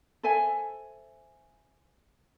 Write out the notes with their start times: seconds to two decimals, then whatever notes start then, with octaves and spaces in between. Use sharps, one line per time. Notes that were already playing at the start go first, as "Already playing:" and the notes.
0.23 A4 C5 E5 G#5